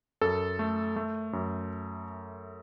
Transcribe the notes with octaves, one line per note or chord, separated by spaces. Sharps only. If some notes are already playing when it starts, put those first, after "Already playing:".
F#2 A4
A3
A3
F#2